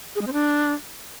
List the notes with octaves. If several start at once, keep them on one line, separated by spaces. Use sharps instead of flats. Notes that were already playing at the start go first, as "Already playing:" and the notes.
G#4
G#3
C4
D4